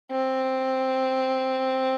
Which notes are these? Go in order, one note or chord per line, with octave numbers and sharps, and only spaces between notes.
C4